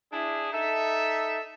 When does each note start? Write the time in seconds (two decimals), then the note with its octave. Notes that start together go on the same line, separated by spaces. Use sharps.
0.12 D4 E4 G#4
0.52 D#4 A4 E5